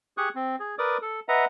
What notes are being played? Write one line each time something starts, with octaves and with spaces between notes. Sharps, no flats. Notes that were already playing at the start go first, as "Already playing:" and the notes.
G4 G#4 C#6 D#6 F#6
C4
G#4
A#4 B4 D5 D6 D#6
A4
B4 D#5 E5 F#5 A#5